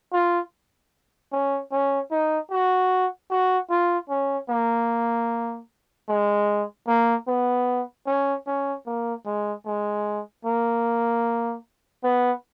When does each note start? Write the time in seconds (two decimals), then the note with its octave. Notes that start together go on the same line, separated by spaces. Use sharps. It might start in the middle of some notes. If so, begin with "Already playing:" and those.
0.13 F4
1.32 C#4
1.72 C#4
2.11 D#4
2.51 F#4
3.31 F#4
3.70 F4
4.10 C#4
4.50 A#3
6.09 G#3
6.87 A#3
7.28 B3
8.07 C#4
8.47 C#4
8.87 A#3
9.26 G#3
9.66 G#3
10.45 A#3
12.04 B3